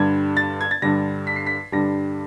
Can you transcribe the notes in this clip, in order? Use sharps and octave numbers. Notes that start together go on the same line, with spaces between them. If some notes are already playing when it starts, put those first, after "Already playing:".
Already playing: G2 D3 G3 G#6
A6
G#6
A6
G2 D3 G3 A#6
B6
C7
B6
G2 D3 G3 A#6